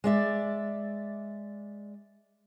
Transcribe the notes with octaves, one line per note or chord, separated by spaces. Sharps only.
G#3 D5 E5